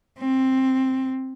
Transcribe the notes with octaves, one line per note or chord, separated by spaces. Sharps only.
C4